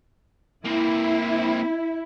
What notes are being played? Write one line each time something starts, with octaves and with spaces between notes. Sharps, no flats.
A#3 C4 E4